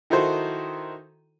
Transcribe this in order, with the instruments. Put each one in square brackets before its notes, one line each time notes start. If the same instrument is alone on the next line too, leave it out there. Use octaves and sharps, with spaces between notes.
[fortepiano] D#3 D#4 E4 F#4 A4 C5